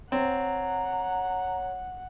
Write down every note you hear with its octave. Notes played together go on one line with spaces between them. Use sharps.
C4 C#5 F#5 A#5